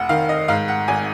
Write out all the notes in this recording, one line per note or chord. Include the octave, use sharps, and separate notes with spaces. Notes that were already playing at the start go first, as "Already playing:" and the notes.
Already playing: F1 F#5
D#3 F5
D#5
G#2 F5
F#5
G#1 G#5